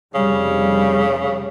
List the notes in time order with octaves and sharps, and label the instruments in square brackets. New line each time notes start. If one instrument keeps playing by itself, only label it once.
[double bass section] F1 G3 [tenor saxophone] C#3